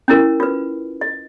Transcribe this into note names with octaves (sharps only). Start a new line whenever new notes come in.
C#4 E4 A#4
F4 B4
D#5